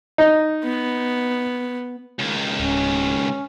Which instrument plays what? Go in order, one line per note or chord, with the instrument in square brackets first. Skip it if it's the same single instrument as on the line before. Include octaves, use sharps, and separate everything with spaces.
[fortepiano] D#4
[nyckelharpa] B3
[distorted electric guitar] C#2 D#3
[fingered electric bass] D1 [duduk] C#4